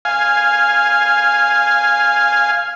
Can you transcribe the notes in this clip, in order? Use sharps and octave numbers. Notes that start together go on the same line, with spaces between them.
F5 G#5